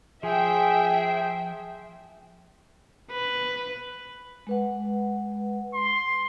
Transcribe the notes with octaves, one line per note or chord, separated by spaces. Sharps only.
F3 G#4 E5 G5
B4
G#3 B4 F#5
C6